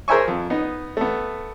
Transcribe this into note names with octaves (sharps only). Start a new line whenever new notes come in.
G#4 A#4 C5 E5 G#5 C#6
F2
B3 D#4
A3 B3